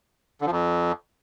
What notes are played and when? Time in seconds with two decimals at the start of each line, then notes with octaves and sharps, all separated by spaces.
0.41 D3
0.46 F3
0.51 F2